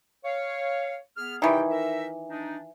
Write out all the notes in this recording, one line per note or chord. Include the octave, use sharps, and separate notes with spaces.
C#5 F5
B3 G#4 F6
C3 D#3 E3 D5 G5
D#4 A#4 E5
D4 D#4